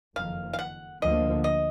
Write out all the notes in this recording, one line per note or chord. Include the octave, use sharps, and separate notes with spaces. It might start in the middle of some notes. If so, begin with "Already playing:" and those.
F#1 F2 D#3 F5
F5
F#5
D2 D3 F3 A#3 D#5
D#5